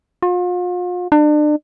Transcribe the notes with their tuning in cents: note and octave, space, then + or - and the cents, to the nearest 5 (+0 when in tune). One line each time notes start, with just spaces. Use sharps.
F4 +40
D4 +35